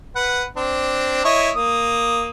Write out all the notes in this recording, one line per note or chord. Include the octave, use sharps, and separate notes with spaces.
B4 F#5
C4 D4
E4 C#5 D#5
A#3 D#6